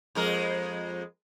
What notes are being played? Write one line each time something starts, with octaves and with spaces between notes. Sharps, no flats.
F2 G#3 A#4